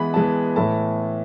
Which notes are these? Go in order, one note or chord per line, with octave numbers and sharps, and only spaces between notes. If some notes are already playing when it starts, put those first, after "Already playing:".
Already playing: E3 G#3 B3 B5
E3 G#3 B3 A5
A2 E3 A3 A5